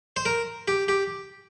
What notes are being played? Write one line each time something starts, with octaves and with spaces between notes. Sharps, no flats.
C5
A#4
G4
G4